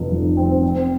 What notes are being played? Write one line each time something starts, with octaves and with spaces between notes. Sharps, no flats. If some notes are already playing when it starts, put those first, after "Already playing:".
Already playing: F1 F2 F3
F1
C4
C4